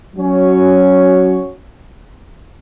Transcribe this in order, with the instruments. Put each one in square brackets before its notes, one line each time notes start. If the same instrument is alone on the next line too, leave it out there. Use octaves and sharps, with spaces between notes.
[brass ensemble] F#3 C#4 F#4 C#5